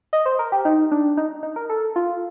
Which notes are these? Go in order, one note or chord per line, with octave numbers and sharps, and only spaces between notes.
D#5
C5
A#4
G4
D#4
D4
D#4
D#4
A#4
A4
F4